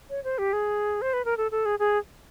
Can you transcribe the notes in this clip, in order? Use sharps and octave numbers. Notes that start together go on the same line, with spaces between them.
C#5
C5
G4
G#4
C5
B4
A#4
A4
A4
G#4
G#4